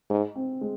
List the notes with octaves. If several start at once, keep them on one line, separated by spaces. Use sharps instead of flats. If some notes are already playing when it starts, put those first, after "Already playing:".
G#2
C4
G#3